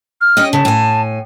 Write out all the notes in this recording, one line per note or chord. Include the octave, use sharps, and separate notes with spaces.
F6
C#4 G4 D#5
C#3 A5
A2 G#5